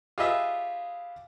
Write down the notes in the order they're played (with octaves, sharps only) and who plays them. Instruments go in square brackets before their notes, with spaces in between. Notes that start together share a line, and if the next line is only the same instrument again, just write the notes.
[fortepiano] F4 G4 G#4 B4 D#5 E5